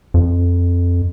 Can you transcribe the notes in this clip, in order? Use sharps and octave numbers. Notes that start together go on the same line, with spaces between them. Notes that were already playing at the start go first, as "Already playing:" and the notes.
F2